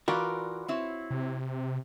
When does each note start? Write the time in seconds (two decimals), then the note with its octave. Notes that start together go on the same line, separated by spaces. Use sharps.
0.08 E3 F4 F#4 A#4 B4 D5
0.68 C4 E4 C#5
1.11 C3